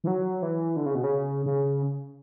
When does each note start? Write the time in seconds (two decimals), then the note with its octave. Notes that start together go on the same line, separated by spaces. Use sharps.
0.04 E3
0.07 F#3
0.42 E3
0.76 D3
0.86 C#3
0.95 B2
1.04 C#3
1.46 C#3